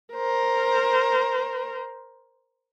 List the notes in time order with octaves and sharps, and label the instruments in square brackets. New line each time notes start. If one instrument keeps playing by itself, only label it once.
[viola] A#4 C5